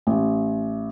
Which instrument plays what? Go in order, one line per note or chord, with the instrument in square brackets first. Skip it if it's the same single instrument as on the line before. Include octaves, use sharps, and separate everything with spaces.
[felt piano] A1